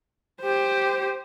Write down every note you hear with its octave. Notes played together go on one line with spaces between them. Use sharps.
G4 C5